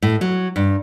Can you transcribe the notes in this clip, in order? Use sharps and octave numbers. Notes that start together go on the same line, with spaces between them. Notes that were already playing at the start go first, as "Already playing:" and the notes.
A2
F#3
G2